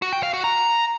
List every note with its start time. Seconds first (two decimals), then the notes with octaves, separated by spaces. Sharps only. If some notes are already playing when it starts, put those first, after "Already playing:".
0.02 F#4
0.13 G5
0.23 F5
0.33 F#4
0.44 A#5